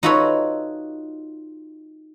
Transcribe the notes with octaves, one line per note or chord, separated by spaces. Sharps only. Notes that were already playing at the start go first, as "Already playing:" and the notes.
D#4 F4 F#4 A4 B4 C#5